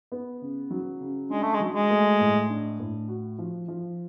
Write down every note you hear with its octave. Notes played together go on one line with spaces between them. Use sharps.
B3
C#3
F#3
C#3
G#3 D4
A3
G#3
F#3
G#3
A3
A2
D4
A2
F#4
F3
F3